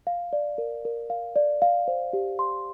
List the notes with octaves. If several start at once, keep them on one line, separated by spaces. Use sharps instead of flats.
F5
D5
A#4
A#4
F5
D5
F5
C5
G4
C6